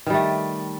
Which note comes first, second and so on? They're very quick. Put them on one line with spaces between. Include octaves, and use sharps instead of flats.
D#3 G3 A3